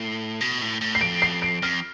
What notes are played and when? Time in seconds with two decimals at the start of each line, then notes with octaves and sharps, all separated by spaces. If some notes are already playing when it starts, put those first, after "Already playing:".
Already playing: A2 C7
0.41 B2
0.61 A2
0.81 A2
0.95 C7
1.01 F2 D7
1.22 C7
1.42 D7
1.62 F2 F6